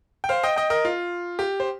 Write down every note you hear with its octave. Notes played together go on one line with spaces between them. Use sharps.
G5
C5 F5
D#5 G5
D#5 G5
A#4 D#5
F4
G4
C5